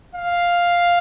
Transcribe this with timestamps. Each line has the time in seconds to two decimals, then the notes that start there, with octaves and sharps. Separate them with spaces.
0.15 F5